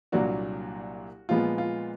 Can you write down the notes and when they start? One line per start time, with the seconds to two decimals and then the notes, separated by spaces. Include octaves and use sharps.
0.12 C2 A#2 F#3 A#3 D4 F#4
1.29 A#2 F3 G#3 B3 F4
1.58 F4